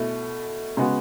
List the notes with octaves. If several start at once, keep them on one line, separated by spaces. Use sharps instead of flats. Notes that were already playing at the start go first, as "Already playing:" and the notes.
Already playing: B2 A3 E4
C#3 G#3 B3 F#4